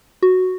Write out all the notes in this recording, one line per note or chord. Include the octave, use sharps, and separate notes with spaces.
F#4